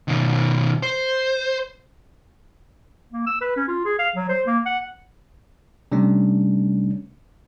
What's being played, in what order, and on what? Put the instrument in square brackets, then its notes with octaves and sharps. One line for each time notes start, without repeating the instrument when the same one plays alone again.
[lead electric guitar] B2 D#3
C5
[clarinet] A#3
E6
B4
C#4
F4
G#4
F5
F#3
C5
A#3
F#5
[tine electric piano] C3 G3 A3 C#4 D4